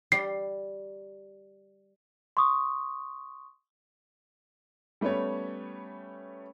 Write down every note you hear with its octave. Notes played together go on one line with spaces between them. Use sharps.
G3 C7
C6 C#6 D#6
G3 A3 B3 C#4 C#5